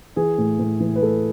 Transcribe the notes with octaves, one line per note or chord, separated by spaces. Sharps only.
E3 G#4
A2
A2
E3
B4
A2 A4